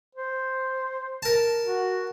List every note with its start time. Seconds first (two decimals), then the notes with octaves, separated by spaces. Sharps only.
0.15 C5
1.22 A#4 A5
1.63 F#4